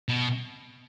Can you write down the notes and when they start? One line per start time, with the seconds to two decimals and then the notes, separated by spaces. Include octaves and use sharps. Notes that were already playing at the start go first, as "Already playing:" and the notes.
0.09 B2